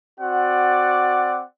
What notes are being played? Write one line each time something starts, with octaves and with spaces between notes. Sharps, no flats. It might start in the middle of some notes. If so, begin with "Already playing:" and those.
C4 F#4 D5 F#5